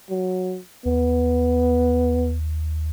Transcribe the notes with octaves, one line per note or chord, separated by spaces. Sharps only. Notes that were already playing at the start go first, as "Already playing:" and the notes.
F#3
D#2 B3